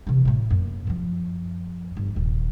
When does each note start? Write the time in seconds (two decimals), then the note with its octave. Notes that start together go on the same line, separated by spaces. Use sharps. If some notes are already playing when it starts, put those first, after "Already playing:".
0.07 C3 E3
0.25 A2 A3
0.50 F#2 A#3
0.87 F#2 F3
1.97 G1
2.16 D#1